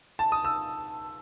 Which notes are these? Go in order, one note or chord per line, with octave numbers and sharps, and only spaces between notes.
A5
D#6
E6